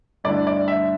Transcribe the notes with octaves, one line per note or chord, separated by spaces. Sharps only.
G2 D3 A3 E4 D5
D5
E5